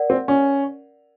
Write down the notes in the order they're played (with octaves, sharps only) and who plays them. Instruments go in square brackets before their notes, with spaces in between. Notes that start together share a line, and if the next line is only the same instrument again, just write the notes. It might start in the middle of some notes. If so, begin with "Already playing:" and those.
Already playing: [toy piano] A#4 D5 F#5
[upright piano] C4
C#4